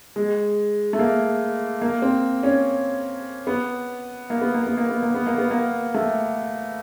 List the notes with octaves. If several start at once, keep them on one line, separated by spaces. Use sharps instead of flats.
G#3
A3
A#3
A#3
C4
C#4
B3
A#3
B3
A#3
B3
A#3
B3
A#3
B3
A#3
B3
A#3
A3